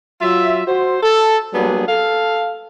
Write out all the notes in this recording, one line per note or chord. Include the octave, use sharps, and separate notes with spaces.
F#3 F4 E5
F#4 C5
A4
F#3 G3 A#3 B3 D4 G#4
A4 F5